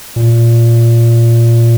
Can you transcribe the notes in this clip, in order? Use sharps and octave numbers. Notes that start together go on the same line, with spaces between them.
A#2